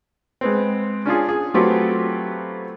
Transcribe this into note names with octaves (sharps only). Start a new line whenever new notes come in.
G#3 B3 C4
C#4 D4 F4 G#4
G#4
F#3 A3 B3 C4 F4 G4